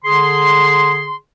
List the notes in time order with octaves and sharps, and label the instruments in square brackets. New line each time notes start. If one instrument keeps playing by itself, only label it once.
[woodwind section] D3 G#4 C6